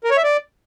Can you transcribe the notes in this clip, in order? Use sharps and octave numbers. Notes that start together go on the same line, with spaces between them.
A#4
C#5
E5
D5